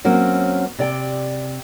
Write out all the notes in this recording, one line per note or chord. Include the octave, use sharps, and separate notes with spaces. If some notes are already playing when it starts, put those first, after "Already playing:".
F#3 A#3 C4 C#4 F#4
C3 D5 G5